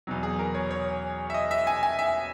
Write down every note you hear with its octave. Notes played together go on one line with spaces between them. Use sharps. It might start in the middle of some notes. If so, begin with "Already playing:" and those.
E2 B2 F#3
G#4
A#4
C#5
C#5
E5
D#5
E5
G#5
G#5
E5